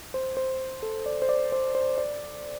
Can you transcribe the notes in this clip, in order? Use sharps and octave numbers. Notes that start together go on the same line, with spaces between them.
C5
C5
A4
D5
C5
D5
C5
C5
D5